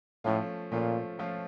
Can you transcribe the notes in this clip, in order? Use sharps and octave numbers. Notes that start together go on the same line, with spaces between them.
A2 F3 A3 C#4 F4
A#2 F3 A3 C#4 F4
F3 A3 C#4 F4